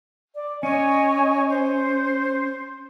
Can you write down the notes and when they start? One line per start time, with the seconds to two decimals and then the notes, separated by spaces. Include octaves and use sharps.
0.35 D5
0.63 C#4 C#5 D#5 G#5
1.49 C5